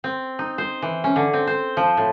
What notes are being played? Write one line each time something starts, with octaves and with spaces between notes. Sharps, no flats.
C4
D#4
C5
E3
C#4
D3
C4
C5
F3
A2